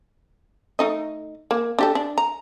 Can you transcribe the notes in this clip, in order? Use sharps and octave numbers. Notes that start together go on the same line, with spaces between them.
A3 D#4 D#5
A#3
D4 G4 A4
D4
A#5